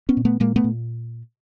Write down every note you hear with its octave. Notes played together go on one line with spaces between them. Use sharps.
B3 C#4
A#2
A3 B3
A#2 G#3 A#3
A3 B3
A#2